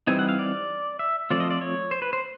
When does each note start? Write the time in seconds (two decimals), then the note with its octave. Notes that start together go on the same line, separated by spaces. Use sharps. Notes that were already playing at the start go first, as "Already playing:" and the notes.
0.07 E3 G3 C4 D#4 G#5
0.19 F#5
0.29 F5
0.39 D5
0.99 E5
1.30 F3 A3 C4 F4 D5
1.40 D#5
1.50 D5
1.61 C#5
1.91 C5
2.02 B4
2.13 C5